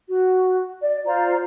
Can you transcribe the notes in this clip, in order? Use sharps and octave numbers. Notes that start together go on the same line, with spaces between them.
F#4
D5
F4 C5 D5 A#5